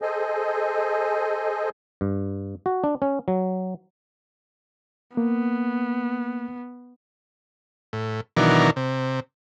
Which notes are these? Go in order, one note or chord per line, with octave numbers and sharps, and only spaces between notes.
G#4 A4 C5 D#5 G#5
G2
F#4
D4
C#4
F#3
A#3 B3
A2
B2 D#3 E3 F#3 D4 A#4
C3